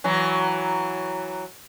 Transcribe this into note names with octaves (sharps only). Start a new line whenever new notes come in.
E3 F#3